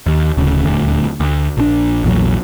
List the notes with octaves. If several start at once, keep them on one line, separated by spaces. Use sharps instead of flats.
D#2
D1 D2 C#3
D#1 D2
D2
A#1 A2 D4
A#1 E2 A#2 F#3